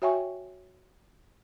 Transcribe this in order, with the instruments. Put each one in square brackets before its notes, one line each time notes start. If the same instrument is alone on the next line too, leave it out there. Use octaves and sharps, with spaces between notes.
[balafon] F#4 C#5 E5 G5 G#5 C#6